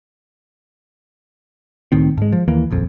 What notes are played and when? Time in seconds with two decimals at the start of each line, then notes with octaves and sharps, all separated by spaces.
1.92 C#2 A2 D#3 C4
2.18 G#2 G#3
2.32 F3
2.48 D#2 E3 A#3
2.71 D#1 A#1 F2